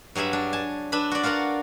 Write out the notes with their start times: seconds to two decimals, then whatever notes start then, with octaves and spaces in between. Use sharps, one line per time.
0.15 G2 F#3 G#4 E5 B5
0.33 D4
0.53 G#5 A5
0.92 D4 B4 E5 B5
1.11 F#4 D5
1.23 F4 F#4 A#4 D5 F#5